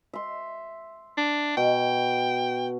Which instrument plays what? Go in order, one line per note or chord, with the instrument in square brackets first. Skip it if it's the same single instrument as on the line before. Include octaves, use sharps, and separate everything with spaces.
[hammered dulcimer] E5 C6
[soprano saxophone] D4
[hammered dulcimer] B2 [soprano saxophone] G5